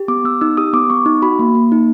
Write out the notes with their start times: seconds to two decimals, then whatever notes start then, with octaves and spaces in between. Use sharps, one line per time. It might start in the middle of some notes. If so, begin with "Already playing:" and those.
Already playing: G4
0.08 B3 D6
0.24 B3 E6
0.41 D#4 E6
0.57 G4 D#6
0.73 B3 D6
0.90 B3 C#6
1.06 D#4
1.22 F#4 B5
1.39 A#3
1.55 A#3
1.72 D#4